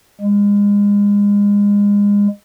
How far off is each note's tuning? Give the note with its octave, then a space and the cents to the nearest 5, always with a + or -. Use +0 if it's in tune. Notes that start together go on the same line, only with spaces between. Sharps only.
G#3 -30